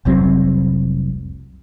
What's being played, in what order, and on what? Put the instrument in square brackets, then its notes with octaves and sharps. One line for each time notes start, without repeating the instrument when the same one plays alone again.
[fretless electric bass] F1 C2 F#3 C4